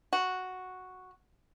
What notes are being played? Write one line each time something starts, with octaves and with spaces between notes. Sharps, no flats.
F#4